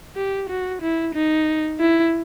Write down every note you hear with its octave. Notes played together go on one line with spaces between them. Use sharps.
G4
F#4
E4
D#4
E4